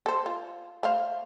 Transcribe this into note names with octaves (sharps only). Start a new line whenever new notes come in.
A4 C5
F4
A3 C5 F5